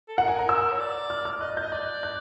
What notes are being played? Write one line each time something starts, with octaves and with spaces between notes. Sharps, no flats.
A4
A#4 F#5
G#5
A#5
E6
C#5
D5
F6
F6
D#5 F#6
D#5 G6
D5 F#6
F#6